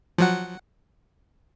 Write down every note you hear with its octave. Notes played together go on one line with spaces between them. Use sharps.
F3 F#3 F#5